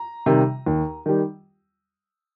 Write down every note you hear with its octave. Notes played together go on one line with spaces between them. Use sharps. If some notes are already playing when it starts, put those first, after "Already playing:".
Already playing: A#5
C3 D#3 G3
D#2
D#3 G3